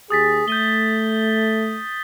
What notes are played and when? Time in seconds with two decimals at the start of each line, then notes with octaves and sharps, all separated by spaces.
0.10 D#2 G4 G#4 D#6 A6 B6
0.48 A3 G6 D#7 G7